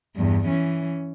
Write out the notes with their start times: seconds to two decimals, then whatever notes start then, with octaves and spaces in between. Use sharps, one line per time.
0.15 E2 G2
0.48 E3 C#4